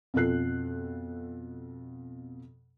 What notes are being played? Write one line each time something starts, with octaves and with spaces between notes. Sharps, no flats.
F2 B2 F4 A4 F#6 C7